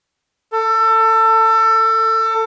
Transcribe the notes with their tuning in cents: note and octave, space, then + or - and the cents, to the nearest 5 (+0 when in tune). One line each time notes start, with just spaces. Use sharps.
A4 +25